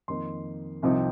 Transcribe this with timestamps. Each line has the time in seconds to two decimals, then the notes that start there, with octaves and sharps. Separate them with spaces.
0.08 F2 D#3 A#3 D#4 C6
0.83 C2 C3 F3 C4 D#4